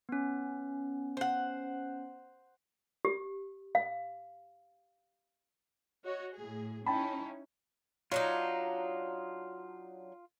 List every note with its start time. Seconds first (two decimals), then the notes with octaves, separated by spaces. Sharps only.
0.09 B3 C#4
1.17 C5 F#5
3.05 G4
3.75 F5
6.05 F#4 C#5 D#5
6.35 A2 G#4
6.86 C#4 D#4 E4 G5 A5 B5
8.12 F#3 D4 D#4 F4